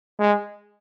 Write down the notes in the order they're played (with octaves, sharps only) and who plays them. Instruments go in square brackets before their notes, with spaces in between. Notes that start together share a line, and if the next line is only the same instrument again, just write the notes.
[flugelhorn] G#3